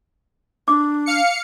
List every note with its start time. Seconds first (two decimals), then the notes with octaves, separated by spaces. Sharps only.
0.68 D4 D6
1.06 F5 C#7